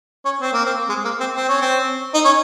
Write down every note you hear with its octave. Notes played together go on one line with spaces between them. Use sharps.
C#4
C4
A#3
C4
G#3
A#3
C4
C4
C#4
C4
D#4
C#4